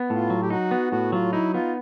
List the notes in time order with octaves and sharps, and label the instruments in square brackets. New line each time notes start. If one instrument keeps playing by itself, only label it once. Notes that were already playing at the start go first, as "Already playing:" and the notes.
Already playing: [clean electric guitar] B3
[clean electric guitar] A2 [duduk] F4
[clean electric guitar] F#3
[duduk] G4
[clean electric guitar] D#4 [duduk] F#4
[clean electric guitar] B3
[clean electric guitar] A2 [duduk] F#4
[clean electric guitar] F#3 [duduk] F4
[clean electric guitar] D#4 [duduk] E4
[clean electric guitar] B3 [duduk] F4